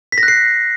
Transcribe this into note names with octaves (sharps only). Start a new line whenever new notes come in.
B6
A#6
F#6
C7